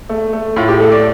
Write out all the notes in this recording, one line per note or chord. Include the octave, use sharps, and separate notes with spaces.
A3
A3
A2 F4
G4
A3 A4
D5